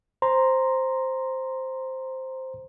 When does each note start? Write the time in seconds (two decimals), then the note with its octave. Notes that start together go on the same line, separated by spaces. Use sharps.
0.22 C5 A#5 C6